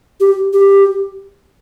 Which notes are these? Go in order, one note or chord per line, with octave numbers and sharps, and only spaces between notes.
G4
G4